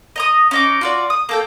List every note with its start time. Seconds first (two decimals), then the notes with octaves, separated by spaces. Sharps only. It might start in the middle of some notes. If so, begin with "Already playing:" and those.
0.16 D#5 A#5 D#6
0.51 C#4 D#4 D6
0.81 F4 F#4 D5
1.10 D#6
1.29 A#3 A4 G5